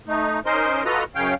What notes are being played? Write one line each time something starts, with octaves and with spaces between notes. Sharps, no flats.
A3 D#4
C#4 D#4 A#4 C5 D#5 C6
F4 F#4 A4 B4 D#5 A#5
F#2 C#3 C#4 C#5 F5 G5